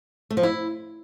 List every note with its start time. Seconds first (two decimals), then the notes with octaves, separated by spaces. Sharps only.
0.31 A3
0.37 F3
0.43 E4